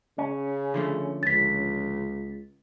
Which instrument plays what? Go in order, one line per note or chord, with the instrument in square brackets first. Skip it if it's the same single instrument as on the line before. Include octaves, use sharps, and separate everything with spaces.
[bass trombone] C#3 [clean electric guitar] C#4
[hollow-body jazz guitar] D3 F3 A3
[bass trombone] C#2 [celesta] A6 B6